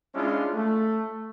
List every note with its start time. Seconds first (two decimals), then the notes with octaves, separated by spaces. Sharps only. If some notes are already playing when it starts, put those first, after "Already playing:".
0.15 G#3 C#4 D4 E4 F4 G#4
0.54 A3